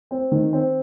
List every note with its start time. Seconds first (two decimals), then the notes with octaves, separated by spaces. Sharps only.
0.11 C4
0.32 D#3
0.53 C4